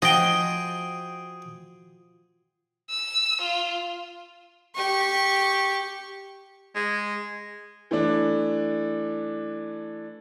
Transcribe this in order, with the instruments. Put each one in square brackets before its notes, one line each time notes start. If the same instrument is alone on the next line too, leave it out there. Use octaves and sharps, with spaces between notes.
[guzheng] F3 F#4 D#5 [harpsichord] G#4 G5
[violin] E6
F4
[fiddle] G4 C#6
[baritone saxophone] G#3
[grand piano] E3 A3 D4